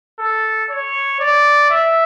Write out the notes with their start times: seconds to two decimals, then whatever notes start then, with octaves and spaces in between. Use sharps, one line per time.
0.19 A4
0.70 C#5
1.20 D5
1.71 E5